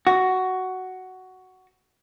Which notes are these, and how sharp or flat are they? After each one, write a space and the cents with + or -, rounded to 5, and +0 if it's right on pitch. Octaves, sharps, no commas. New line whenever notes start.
F#4 +10